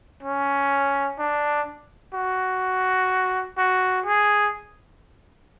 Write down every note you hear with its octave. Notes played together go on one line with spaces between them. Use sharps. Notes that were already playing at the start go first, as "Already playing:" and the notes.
C#4
D4
F#4
F#4
G#4